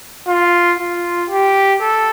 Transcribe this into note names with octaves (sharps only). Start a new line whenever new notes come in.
F4
F4
G4
A4